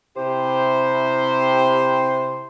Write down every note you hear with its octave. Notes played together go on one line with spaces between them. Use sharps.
C3 E4 G4 C5